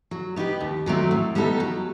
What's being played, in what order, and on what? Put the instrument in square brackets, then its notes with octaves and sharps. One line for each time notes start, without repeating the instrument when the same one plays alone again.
[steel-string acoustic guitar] F#3
B3 D#4 G4 B4
D#2
D#3 F#3 A3 C4
A2
G3 B3 D#4 A4
F#3